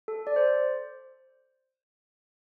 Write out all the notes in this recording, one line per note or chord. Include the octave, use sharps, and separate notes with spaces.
A4
D5
C5